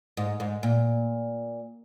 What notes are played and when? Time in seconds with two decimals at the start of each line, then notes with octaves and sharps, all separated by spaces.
0.17 G#2
0.40 G#2
0.63 A#2